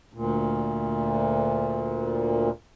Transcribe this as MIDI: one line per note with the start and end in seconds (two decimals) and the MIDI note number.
0.13 2.50 38
0.13 2.50 46